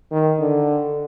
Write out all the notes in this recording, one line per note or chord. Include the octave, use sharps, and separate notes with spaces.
D#3
D3